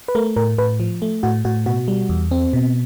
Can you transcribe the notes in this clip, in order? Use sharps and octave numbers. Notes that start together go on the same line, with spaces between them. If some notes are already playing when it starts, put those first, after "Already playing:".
B4
A3 A#4
A2 A#4
A2 B4
F3
A3
A2 F#4
A2 F#4
B2 F#4
G3
E2
C4
B2